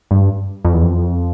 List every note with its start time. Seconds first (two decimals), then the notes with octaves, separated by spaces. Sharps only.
0.11 G2
0.65 F2
0.74 E2
0.83 F2